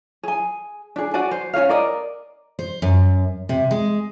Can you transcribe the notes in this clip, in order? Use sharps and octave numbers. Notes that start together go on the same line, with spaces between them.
G#4 G#5
D4 G#4
F#4 D5 G#5
C5
C#4 F#4 C#5 F5
A#4 D5 D#5
C5
F#2
C3
G#3